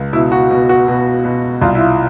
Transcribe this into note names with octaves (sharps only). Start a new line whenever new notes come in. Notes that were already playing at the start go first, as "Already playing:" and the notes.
Already playing: C#2
B2 E4
F#4
B2
F#4
B2
B2
C2 F4
E4
F4